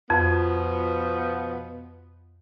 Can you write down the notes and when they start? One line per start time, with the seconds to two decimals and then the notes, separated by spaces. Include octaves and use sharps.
0.10 F2 B2 F3 B3